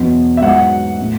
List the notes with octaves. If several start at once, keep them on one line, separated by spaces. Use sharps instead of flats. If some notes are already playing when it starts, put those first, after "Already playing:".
Already playing: E2 B2 F#3
E5
G#2 F#3 F#5
A2